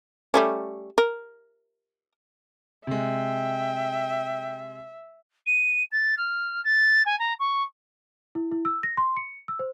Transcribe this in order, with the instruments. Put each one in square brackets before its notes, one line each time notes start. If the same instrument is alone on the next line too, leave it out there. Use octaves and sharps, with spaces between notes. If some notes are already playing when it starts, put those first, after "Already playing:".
[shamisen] G3 A3 C#4
A#4
[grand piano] C3 G#3 [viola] E5 [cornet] G5
[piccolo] D#7
A6
F6
A6
G#5
A#5
C#6
[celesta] E4
E4
E6
A#6
C6
C#7
E6
C5